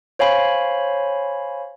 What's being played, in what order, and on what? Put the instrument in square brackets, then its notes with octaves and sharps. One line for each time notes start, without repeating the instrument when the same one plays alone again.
[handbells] C5 C#5 F5 G#5 B5